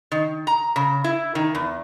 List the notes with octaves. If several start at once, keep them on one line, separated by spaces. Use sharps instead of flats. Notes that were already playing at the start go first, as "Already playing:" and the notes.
D#3
A#5
C#3
E4
D#3
E2